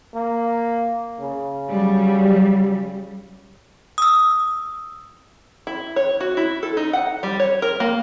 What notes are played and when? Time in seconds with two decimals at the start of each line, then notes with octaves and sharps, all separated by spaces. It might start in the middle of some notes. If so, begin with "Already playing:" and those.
0.14 A#3
1.20 C#3
1.71 F#3 G3
3.98 D#6 E6
5.67 E4
5.96 C#5
6.20 F#4
6.37 E4
6.63 A4
6.77 D#4
6.93 F#5
7.23 G3
7.40 C#5
7.62 A#4
7.80 A#3